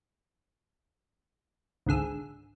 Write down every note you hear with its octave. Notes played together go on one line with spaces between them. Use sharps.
G#1 C#2 D3 G#4 E6